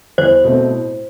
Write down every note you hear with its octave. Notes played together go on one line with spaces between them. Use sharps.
E2 C5
B2 A3 C4
A2